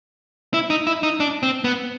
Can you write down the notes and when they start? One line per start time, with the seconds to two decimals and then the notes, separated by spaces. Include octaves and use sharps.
0.54 E4
0.70 D#4
0.87 E4
1.03 D#4
1.20 D4
1.43 C4
1.64 B3